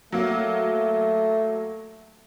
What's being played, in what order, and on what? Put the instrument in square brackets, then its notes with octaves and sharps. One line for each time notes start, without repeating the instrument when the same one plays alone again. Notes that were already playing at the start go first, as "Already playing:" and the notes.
[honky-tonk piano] F#3 A#3 [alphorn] A3